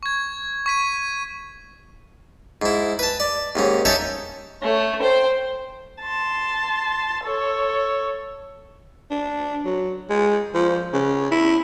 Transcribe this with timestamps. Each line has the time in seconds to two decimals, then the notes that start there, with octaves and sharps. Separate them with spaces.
0.03 C#6 G#6
0.66 C#6 B6 D#7
2.62 G#2 E4
2.99 B4 A5
3.20 D5
3.55 D#2 G#2 C#4
3.85 C#4 D#4 A4 C#5 E5 G5
4.62 A3 C#5
5.02 C5 G5
6.02 A5 C6
7.24 A4 C#5
9.11 D4
9.65 F#3
10.10 G#3
10.54 F3
10.93 C#3
11.31 E4